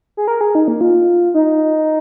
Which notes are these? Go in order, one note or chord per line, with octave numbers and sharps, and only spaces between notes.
G#4
A#4
G#4
D#4
A#3
F4
D#4